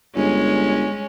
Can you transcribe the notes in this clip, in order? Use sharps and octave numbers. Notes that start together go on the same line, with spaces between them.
G1 G#3 C#4